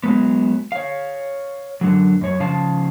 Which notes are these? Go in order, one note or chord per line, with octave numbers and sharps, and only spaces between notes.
F#3 G#3 B3
C#5 F5
F#2 D3 F#3
F#2 C#5
C#3 F3 F5 A5